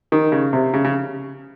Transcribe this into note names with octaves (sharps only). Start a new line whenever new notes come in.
D#3
C#3
C3
C#3
C#3